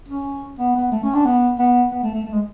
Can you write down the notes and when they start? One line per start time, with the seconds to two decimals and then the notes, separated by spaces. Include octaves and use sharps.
0.08 C#4
0.59 B3
0.76 B3
0.92 A3
1.03 C#4
1.14 D4
1.25 B3
1.59 B3
1.91 B3
2.03 A3
2.14 A3
2.25 A3
2.32 G#3